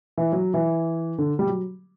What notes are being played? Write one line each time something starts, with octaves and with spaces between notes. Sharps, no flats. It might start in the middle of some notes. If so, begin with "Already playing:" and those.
E3
F#3
E3
D3
G3
F#3